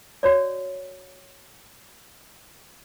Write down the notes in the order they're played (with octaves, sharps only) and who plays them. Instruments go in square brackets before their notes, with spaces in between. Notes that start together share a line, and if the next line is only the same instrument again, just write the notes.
[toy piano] F#4 C#5 D5